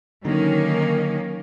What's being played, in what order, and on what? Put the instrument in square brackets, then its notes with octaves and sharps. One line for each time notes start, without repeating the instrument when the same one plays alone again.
[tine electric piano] D3 F#3 D#4 [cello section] D#3 A#3 C#4